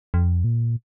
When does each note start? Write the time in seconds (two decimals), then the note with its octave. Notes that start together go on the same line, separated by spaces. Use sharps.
0.14 F2
0.44 A#2